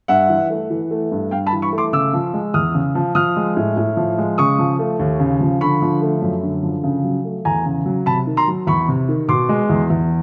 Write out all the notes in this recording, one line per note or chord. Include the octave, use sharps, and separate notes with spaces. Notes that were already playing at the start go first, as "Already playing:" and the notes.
G2 E5 F#5
E3
A3
E3
A3
G2
G2 F5 G5
A5 B5
E3
B5 C#6
A3
C6 D6
C#3 D6 E6
F3
G#3
E2 D#6 F6
C#3
F3
F3 D#6 F6
G#3
A2
A2
F3
G#3
C#3 C#6 D#6
F3
A3
D#2
C#3
F3
D3 B5 C#6
F3
A3
F#2
D3
F3
C#3
F#3
A3
E2 G#5 A#5
C#3
F#3
C3 A5 B5
D#3
A#5 C6
F#3
E2 B5 C#6
C3
D#3
B2 C6 D6
G#3
E2
E2